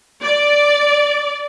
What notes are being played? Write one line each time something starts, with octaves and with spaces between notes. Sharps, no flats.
D5